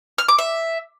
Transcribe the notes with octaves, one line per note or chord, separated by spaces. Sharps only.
F6
D6
E5